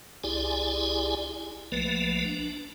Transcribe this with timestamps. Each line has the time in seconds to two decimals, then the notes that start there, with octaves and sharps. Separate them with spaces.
0.24 C2 E4 G4 G#4 D5 G#5
1.72 B1 F3 A3 A#3 B4
2.25 D4